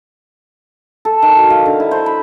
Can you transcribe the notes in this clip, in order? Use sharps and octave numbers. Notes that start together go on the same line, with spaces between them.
A4
D#3
F#4
F5
D3
E4
C5
B5